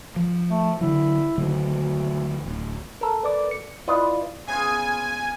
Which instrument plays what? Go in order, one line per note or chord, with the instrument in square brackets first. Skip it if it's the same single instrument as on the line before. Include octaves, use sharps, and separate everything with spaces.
[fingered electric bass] F3
[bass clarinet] A3
[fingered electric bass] D3 F#3 [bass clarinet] E4
[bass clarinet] D2 [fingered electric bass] D3 D#3 F#3
[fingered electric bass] D1
[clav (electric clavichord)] A4 A#4
[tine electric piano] B4 D5 D6
C#7
[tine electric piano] E4 D5 [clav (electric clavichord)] F4 B4 D#5
[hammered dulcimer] C#3 B3 F4 [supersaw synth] G#5